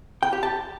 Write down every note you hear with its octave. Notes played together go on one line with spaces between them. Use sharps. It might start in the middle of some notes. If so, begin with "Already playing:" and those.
G5
G4
A5